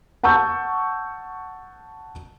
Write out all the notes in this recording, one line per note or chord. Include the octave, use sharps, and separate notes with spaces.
F#5 A5 C#6 E6 G6